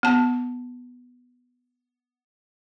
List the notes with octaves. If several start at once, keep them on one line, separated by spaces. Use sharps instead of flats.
B3 A5